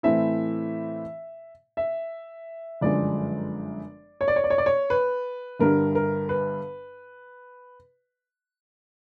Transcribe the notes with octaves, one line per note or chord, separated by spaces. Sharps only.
A2 E3 A3 C4 E4 E5
E5
G1 F#2 D3 F3 G#3 D5
C#5
D5
C#5
D5
C#5
D5
C#5
B4
G1 G2 D3 G3 A#4
A#4
B4